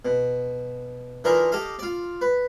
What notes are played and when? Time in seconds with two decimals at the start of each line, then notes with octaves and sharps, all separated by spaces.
0.05 B2
1.24 D3 E3 D#4 F4 A#4
1.52 G4 A4 D#5 F5
1.79 F4 D5
2.21 B4